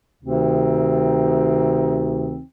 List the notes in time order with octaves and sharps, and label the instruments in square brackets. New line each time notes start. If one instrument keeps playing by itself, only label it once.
[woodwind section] D2 C3 D#3 C4 D#4